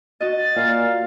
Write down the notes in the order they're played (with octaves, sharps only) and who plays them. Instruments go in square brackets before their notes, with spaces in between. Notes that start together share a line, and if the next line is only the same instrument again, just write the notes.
[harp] F#4 D#5 [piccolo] A6
[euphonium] A#2 [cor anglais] F5